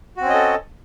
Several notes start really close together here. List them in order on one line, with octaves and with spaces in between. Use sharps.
F#4 C4 C#4 D#5 A4